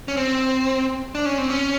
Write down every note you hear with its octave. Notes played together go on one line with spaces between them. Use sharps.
C#4
C4
D4
C#4
C4
C#4